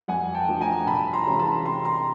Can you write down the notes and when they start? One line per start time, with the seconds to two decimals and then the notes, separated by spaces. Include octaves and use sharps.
0.08 F2 F#5 G#5
0.34 G5 A5
0.48 D3 F3 A3
0.61 G#5 A#5
0.86 C2 A5 B5
1.13 A#5 C6
1.26 C3 E3 G#3 C#4
1.39 A5 B5
1.65 C3 A#5 C6
1.85 A#5 C6